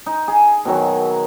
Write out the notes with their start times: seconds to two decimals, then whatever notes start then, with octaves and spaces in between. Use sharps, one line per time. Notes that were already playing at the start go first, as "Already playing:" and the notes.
0.06 D#4
0.28 G#4
0.65 B2 D#3 F#3